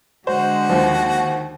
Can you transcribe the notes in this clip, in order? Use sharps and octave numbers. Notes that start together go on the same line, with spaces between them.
D3 G#3 F#4 C5
D#2 F3